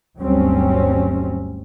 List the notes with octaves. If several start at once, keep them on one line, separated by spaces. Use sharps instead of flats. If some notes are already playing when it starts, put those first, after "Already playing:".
G1 D2 F#3 G3 C4 C#4